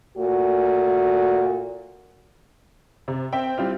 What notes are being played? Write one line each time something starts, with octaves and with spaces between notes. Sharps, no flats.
A#2 A3 F#4
C3
C4 E5 G5
G3 C4 E4 F4